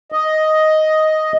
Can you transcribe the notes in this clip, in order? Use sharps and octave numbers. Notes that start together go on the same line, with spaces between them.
D#5